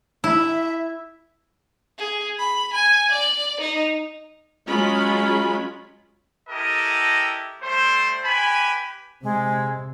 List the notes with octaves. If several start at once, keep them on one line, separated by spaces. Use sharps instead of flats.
E4 E5
G#4
B5
G#5
D5
D#4
F#3 G#3 C#4 F4 B5
E4 G4 A4 A#4 D#5
G3 A3 C5
G4 B4 G#5 B5
C3 G#3